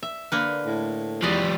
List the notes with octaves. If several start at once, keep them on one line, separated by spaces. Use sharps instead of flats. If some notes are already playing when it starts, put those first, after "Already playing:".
E5
D3 A#3 B4
A2
E2 F3 G3 B4 D5 D#5